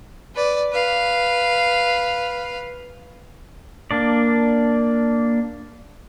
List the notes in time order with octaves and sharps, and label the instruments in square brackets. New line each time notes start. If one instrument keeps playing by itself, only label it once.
[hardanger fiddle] B4 D5
B4 F5
[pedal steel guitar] A#3 D4 D5